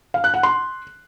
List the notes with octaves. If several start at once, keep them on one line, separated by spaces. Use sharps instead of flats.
F5
F#6
F#5
C6